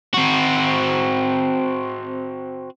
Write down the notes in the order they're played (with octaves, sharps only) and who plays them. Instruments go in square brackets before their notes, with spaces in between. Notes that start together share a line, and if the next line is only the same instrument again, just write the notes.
[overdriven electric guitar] C4 F#4